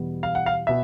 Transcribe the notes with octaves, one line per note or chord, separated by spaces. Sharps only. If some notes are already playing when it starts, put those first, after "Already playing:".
Already playing: E2 B2 G3 B3
F5
F#5
F5
B2 E5